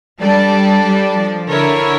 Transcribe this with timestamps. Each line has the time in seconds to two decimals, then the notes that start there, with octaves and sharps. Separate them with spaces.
0.21 G3 D4 A4 D5 A5
0.86 G3
1.18 F3
1.50 D3 E4 A#4 C#5